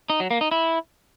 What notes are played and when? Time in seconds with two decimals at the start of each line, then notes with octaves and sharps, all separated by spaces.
0.10 D#4
0.20 F#3
0.31 A#3
0.41 D#4
0.51 E4